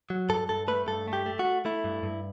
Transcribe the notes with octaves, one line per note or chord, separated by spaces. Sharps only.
F#3
G2 A4
G2 A4
A3 B4
G2 A4
A3
G4
A3
F#4
A3
A3 E4
G2
G2